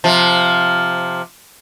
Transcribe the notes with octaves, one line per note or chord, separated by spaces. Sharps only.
C3 F3